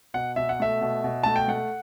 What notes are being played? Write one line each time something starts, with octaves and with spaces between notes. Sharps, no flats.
B2 F#5
B2 E5
F#5
A3 E5
B2
B2
A3 A5
G5
A3 F#5